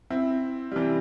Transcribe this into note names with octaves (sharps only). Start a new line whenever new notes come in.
C4 E4
G3
C3 E3